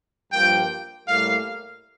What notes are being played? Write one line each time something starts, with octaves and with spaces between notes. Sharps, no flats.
G2 F3 A#3 G5
A2 G3 A#3 F5